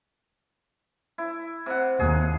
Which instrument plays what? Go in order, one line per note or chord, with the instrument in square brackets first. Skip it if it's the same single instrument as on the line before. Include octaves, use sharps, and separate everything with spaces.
[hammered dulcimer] E4
C3 F#5
[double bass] D#2 [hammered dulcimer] G#4